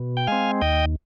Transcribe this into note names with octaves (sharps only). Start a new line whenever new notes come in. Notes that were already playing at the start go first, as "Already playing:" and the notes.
Already playing: B2
G5
G#3 C4 F5 G#5
D#2 D#5 G5